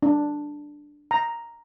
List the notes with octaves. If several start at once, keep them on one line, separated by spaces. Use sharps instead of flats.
D4
A#5